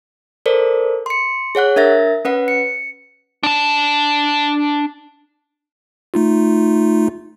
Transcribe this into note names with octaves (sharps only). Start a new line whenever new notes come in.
A4 A#4 C5 D5
C6 C#7
G#4 C#5 F#5 F#6
D4 A#4 E5 A6 A#6
C#4 B4 F#5
C#7
D4 A5
A3 D#4 F4